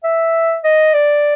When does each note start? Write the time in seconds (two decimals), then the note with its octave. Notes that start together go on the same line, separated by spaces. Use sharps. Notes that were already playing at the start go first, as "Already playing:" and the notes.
0.04 E5
0.64 D#5
0.94 D5